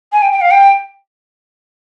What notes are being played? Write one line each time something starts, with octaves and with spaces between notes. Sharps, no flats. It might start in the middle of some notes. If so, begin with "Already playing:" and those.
G#5
G5
G5
F5
G5